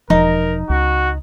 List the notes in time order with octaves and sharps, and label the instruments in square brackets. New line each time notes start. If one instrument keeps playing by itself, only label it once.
[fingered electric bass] E1 F3 [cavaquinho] D#4 [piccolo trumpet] A#4
[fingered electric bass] C#2 [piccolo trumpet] F#4